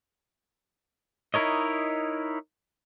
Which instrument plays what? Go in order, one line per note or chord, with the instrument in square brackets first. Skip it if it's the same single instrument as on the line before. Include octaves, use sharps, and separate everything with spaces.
[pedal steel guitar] D#4 E4 A#4 C#5 D#5